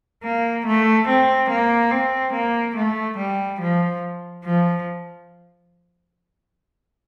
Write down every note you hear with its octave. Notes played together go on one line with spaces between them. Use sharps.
A#3
A3
C4
A#3
C4
A#3
A3
G3
F3
F3